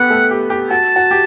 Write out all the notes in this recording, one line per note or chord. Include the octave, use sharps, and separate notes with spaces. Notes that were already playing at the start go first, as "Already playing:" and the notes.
Already playing: B3 G4 A4 B4 F#5
A3 A4
G4
G4
F#4 A5
F#4
G4